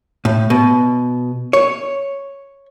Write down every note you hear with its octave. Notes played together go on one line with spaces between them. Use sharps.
A2
B2
C#5